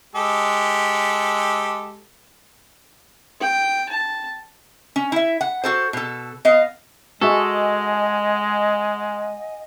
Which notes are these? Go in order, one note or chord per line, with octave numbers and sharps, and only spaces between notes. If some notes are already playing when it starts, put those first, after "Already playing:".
G#3 G4 A4
G5
A5
C#4
E4 E5
F#5
F#4 A4 C5
B2 A4
B3 D#5 F5
G#3 F#4 G#4 A4 D#5 E5 F#5 G#5